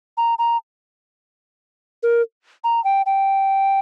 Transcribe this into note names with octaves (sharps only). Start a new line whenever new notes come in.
A#5
A#5
A#4
A#5
G5
G5